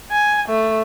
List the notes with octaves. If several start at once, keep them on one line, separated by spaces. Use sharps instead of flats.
G#5
A3